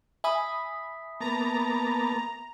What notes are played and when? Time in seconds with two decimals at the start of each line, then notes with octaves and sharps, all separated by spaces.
0.24 E5 G#5 B5 D#6
1.20 A#3 B3 A5 A#5